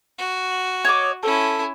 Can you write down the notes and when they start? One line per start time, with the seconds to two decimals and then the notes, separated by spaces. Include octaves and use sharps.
0.18 F#4
0.85 C#5 D#5 D6
1.23 C#4 E4 A4